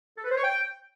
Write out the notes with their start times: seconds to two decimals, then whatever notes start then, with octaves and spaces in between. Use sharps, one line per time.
0.18 A4
0.24 B4
0.31 C5
0.37 C#5
0.43 G5